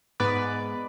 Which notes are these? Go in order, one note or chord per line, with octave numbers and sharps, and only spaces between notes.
G#2 G#3 B3 B4 D5